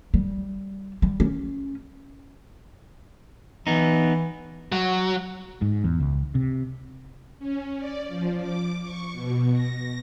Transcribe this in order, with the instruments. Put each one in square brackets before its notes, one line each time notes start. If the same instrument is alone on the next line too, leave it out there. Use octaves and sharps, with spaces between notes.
[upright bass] G3
G3
C#4
[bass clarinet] E3 [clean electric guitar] B3 D#4
[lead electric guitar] F#3
[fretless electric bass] G#2
E2
C#2
C3
[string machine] C#4
D5
F3
D6
C#6
B2
A#6